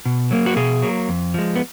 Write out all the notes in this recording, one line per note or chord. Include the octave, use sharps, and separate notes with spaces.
B2
F#3 A#3
F#4
B2 G#4
F#3 A#3
F2
F3 G#3
B3